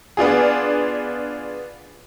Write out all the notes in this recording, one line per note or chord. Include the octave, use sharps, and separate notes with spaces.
B3 D4 F4 G#4